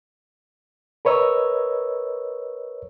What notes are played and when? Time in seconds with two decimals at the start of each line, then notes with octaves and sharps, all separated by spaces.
1.05 A#4 B4 C#5 D#5 E6